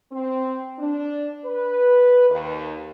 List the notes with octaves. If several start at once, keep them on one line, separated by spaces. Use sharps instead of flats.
C4
D4
B4
D#2